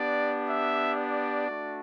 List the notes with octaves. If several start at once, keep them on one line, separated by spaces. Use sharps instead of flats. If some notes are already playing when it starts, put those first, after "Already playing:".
Already playing: B3 D4 G4 D5
E5
D5
A3 D4 F#4